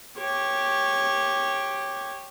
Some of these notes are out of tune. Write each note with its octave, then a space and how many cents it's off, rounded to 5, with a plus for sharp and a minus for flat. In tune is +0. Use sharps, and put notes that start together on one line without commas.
G4 +0 C#5 -15